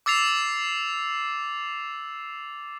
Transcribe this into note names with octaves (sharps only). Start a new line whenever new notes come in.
D6 E6 A6 C7 F7